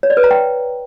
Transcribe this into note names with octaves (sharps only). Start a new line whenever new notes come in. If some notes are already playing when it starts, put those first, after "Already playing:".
C#5
D5
B4
A#5
G5